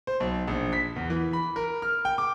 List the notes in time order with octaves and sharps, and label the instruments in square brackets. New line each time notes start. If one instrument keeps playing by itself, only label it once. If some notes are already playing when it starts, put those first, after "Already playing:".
[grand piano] C5
B1
A#1
B6
E2
E3
B5
A#4
F6
G5
D6